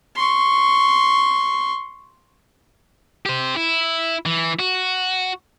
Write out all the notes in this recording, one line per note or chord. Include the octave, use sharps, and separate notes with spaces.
C6 C#6
G4 C5
E4
E3
F#4